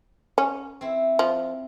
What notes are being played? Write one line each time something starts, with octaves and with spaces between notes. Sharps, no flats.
C#4
C4 E4
F3